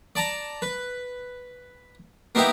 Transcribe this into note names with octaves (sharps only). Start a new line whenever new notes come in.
D5 A5 A#5
B4
A#3 B3 D#4 E4 G4